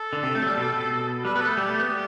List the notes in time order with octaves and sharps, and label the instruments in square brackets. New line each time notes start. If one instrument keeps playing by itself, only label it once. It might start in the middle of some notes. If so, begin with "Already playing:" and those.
Already playing: [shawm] A4
[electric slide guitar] D3
C3
A3
F#3
G3
B2
B2
[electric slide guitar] G3 [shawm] B4
[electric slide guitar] B3 [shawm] B4
[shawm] A4
[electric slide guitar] A3
[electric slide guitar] G3 [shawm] G4
[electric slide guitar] A3
B3
G3